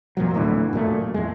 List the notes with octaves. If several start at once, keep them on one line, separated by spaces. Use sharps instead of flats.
F2 A#2 F3 F#3
D1 A2 D3 E3
F#2 A#2 G#3 A3
E2 G#3